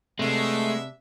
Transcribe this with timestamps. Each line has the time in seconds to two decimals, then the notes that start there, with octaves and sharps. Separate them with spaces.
0.19 C3 G#3 A3 B3 D4 E5